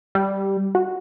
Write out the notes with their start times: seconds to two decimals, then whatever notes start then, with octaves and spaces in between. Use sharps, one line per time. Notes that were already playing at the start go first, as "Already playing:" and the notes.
0.15 G3
0.75 F#4